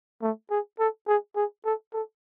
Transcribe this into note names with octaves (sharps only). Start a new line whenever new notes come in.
A3
G#4
A4
G#4
G#4
A4
A4